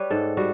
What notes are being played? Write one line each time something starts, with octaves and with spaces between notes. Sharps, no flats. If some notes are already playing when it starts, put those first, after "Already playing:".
Already playing: G3 B4 C#5
G#2 A4
G3 F#4